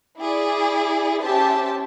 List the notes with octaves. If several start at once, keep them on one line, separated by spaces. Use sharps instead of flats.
E4 G#4 D5
C#4 G4 C5 E5 A5